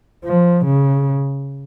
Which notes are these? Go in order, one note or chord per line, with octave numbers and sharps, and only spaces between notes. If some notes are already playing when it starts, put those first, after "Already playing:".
F3
C#3